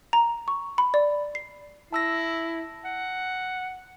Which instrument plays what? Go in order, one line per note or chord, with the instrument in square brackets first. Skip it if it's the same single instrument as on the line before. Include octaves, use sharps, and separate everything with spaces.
[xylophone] A#5
C#6
B5
D5
C7
[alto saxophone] E4 [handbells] A5 E6 A#6
[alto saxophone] F#5